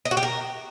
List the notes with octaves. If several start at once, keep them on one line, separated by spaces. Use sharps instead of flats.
D#5
F#4
G4
A#4